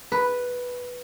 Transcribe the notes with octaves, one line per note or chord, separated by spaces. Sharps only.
B4